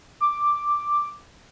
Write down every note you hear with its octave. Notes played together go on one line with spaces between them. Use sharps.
D6